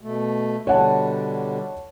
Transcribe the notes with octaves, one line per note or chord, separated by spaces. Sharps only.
B2 A3
B2 D3 G3 C#5 F#5 A5